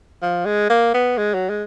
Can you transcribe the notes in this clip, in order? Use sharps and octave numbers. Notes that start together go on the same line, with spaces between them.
F3
G#3
A#3
B3
G#3
F#3
G#3